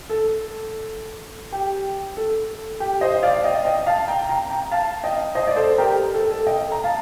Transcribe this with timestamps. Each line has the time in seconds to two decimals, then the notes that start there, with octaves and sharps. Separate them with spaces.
0.10 A4
1.52 G4
2.17 A4
2.80 G4
3.01 C5 D#5
3.23 D5 F5
3.44 D#5 G5
3.65 D#5 G5
3.86 F5 A5
4.08 G5 A#5
4.29 G5 A#5
4.50 G5 A#5
4.71 F5 A5
5.03 D#5 G5
5.35 C5 D#5
5.47 D5
5.56 A4 C5
5.78 G4 A#4
6.14 A4
6.31 A4
6.47 D#5 G5
6.72 A#5
6.84 F5 A5